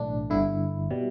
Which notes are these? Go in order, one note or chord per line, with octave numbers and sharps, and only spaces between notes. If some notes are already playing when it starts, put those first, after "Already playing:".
Already playing: B1 A2 E3 A3 D4
G1 G2 D3 E4
B2 G3